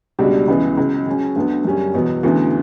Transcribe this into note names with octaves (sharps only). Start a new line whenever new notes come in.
C#2 B2 G3 D4 F#4
C#2 C#3 E3 B3
C#2 C#3 F#3
C#3 F#3 C#4
D2 D3 F#3 B3
F#2 C#3 G3 C#4
E2 B2 F#3 B3
D2 C#3 E3 B3 F#4